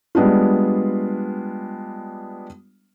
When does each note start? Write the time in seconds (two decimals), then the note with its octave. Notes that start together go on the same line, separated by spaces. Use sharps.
0.15 G3 G#3 B3 D4 F4